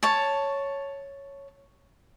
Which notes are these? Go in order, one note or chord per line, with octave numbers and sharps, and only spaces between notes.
C#5 A5